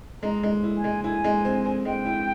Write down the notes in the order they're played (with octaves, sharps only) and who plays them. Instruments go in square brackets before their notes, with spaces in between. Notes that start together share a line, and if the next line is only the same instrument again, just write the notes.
[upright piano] G#3 [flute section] A#5
[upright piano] G#3
E4
[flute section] G#5
[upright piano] G#3
[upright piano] E4 [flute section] G#5
[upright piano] G#3
C4
C4
[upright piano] G#3 [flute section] G5
[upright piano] E4